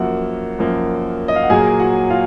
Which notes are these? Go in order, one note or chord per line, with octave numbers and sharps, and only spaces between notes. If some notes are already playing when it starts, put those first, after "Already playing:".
Already playing: F#2 F3 A#3 F#4 F#5
F#2 F3 A#3
D#5
F5
F#5
A#2 F#3 A#3 G#4 G#5
F#4 F#5
F4 F5